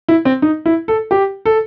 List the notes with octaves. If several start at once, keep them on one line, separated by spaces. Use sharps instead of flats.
E4
C4
D#4
E4
A4
G4
A4